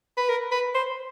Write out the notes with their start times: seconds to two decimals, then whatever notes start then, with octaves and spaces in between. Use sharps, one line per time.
0.17 B4
0.29 A#4
0.52 B4
0.75 C5